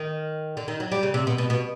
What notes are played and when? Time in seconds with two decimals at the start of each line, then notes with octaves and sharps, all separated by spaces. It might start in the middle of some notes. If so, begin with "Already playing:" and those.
Already playing: D#3
0.57 D3
0.68 D#3
0.80 F#3
0.92 G3
1.03 C#3
1.14 C3
1.27 B2
1.38 B2
1.50 B2